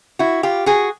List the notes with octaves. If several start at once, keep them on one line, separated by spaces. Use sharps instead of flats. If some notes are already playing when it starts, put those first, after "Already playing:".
E4 F#4
F4 G4
F#4 G#4